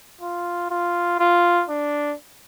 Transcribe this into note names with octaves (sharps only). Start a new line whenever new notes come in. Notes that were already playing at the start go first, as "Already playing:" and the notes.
F4
F4
F4
D4